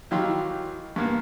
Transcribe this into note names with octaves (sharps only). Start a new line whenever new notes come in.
D#3 E3 F#3 G4 F5 C6
G2 A#3 B3